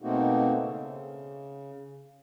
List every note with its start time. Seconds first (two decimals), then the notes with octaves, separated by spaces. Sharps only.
0.02 B2 A3 A#3 C4 D#4 F#4
0.60 C#3